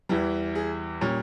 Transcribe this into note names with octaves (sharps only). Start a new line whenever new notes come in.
E2 E3 G3
G#4
A#2 G3 C#4